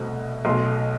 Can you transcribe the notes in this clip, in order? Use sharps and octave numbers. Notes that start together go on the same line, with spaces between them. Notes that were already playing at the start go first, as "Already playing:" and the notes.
Already playing: C2 B2 A3 C4
B1 B2 A3 C6